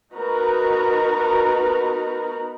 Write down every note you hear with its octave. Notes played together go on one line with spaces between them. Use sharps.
B3 D#4 F#4 A#4 B4 A#5